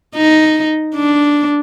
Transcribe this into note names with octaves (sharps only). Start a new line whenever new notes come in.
D#4
D4